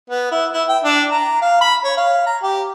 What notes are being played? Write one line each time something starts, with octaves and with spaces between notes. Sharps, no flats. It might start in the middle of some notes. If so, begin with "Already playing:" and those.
B3
E4
E4
G5
D4
A#5
F5
B5
C#5
F5
A#5
G4